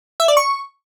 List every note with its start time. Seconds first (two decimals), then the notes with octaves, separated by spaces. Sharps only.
0.20 E5
0.28 D5
0.37 C#6